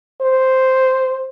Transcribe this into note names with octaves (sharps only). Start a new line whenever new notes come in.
C5